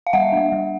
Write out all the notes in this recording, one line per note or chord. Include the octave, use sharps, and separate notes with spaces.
F5
G3 E5 F#5
A#3 D4
G3